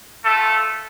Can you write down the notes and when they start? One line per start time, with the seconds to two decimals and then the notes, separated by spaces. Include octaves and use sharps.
0.24 A3 F4 A4